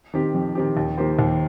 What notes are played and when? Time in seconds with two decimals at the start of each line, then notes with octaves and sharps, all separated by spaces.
0.14 D#3 C4 G4
0.34 F2
0.55 D#3 C4 G4
0.77 D#2
0.98 D#3 A#3 G4 C5
1.19 D#2